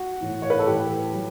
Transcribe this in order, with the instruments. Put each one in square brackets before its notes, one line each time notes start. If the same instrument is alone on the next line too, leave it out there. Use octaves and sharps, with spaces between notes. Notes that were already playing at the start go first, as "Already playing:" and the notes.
Already playing: [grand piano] F#4
A2 E3
C#5
B4
A4
A2 E3 G4
F#3